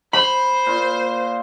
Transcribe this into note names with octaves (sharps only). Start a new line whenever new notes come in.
C5 B5
A#2 F4